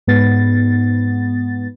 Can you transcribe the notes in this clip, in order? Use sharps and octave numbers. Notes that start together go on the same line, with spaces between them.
G#2 B3 A6